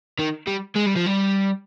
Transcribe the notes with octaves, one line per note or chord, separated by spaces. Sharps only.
D#3
G3
G#3
G3
F3
G3